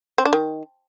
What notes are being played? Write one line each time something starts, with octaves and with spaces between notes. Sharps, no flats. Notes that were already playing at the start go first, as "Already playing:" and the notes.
C4
D4
D#3